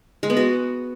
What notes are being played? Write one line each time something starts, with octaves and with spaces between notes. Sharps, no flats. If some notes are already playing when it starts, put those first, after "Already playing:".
G#3
B3
F#4